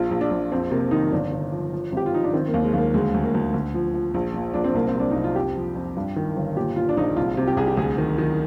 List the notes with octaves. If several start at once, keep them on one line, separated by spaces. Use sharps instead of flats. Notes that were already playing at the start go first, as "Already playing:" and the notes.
Already playing: A#1 F4
A#1
D4
A#1
F2 C4
C3 A#3
D#3 D#4
G1 D4
G1
F3
F3
G#1 G4
F4
F3 D#4
D4
D#3 C4
A#3
D#2
G#3
D#2 A#3
D2 G#3
D2
A#3
D2
D2
F3
F3
A#1
A#2
A#1 D4
C4
C2 A#3
C4
C2 D4
C2 D#4
F4
F2 G4
F3
F2
G2
D#3
G1
A#2 G4
A#2 F4
D4
A#1 D#4
C2 F4
C3
G4
C2 G#4
G4
D2 G#4
D#3
D#3